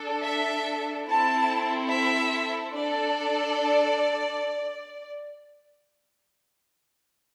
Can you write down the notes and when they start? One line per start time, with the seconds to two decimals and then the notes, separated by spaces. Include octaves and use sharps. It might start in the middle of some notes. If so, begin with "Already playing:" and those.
Already playing: D4 A4
0.24 E5
1.08 C4 E4 A4 A5
1.91 E5
2.74 D4 A4 D5